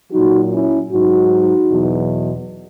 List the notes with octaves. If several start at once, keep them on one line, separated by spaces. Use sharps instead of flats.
A#2 F#3 D#4 F#4
C#4 E4
G#2 F#3 D#4 F#4
E2 B2 F#3